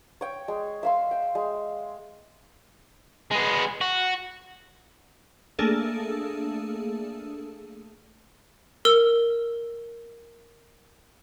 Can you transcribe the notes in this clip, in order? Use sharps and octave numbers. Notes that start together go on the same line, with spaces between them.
C#5 G5
G#3
E5 F5 C6
G5
G#3
G#3 B3
F#4
A3 A#3 D4 G#4 A4
A#4 E6